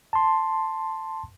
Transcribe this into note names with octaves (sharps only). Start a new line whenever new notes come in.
A5 C6